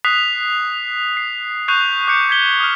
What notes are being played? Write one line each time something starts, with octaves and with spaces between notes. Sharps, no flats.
D#6 F#6 B6 C7 F7
C7
C#6 F#6 G6 C7 F7
D6 F#6 G6 C#7
G6 G#6 B6 G7
D#6 F6